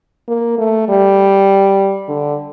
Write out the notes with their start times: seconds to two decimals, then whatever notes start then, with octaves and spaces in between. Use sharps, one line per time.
0.28 A#3
0.58 A3
0.89 G3
2.08 D3